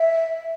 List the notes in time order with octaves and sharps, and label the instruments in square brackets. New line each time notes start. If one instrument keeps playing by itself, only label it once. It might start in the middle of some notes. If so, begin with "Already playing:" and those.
Already playing: [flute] E5